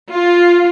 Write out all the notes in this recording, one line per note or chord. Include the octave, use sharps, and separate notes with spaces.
F4